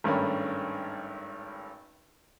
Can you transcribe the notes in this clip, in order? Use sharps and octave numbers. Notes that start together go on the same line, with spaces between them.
G#1 G2 A3 C#4 A#4 B5